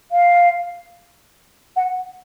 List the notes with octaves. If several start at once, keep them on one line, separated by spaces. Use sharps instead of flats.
F5
F#5